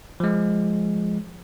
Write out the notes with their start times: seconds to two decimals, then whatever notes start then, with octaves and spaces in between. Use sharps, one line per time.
0.20 F3 G#3